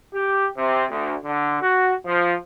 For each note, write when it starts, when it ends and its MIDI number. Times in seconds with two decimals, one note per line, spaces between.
0.14 0.48 67
0.57 0.85 48
0.90 1.15 38
1.24 1.58 50
1.62 1.93 66
2.06 2.35 53